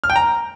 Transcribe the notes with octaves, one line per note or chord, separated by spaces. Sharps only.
F6
G5
A#5